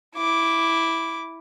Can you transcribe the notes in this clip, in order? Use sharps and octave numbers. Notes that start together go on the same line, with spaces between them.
E4 D6